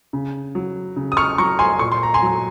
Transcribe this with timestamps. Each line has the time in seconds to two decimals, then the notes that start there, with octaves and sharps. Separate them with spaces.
0.13 C#3
0.55 F#3
0.96 C#3
1.12 D#6
1.17 C#6 F6
1.38 F#3 A#5 C#6
1.59 G#5 C6
1.79 A#2 C#6
1.92 C6
2.03 A#5
2.14 G#5 C6
2.22 F#3